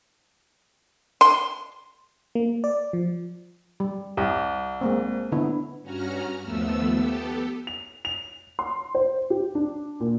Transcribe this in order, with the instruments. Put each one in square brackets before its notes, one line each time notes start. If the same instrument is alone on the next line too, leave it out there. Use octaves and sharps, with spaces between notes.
[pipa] C6
[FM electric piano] A#3
D5
F3
[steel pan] G3
[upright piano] C2 [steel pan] G4
[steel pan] G#3 A#3 C4
D3 B3 E4
[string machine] G2 C#4 F#4 A#5 F6
D#2 F3 A3 B3 E6
B3 G4 A4
[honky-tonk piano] F7
F7
C6
C5
G4
D4
A#2